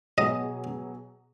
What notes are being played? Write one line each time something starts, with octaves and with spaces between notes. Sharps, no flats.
B2 F#3 B3 G#4 D#5